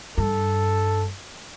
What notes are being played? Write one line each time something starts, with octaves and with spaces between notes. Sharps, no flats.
G2 A4